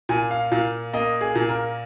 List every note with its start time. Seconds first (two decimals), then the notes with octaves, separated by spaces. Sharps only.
0.09 A#2 G#5
0.31 F5
0.52 A#2 F5
0.93 A#3 D#5
1.21 G#4
1.35 A#2
1.49 A#4